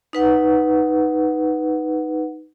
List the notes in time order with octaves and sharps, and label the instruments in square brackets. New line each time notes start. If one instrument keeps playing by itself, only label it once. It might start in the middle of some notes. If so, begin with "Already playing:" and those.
[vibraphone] D#4 B4 F#5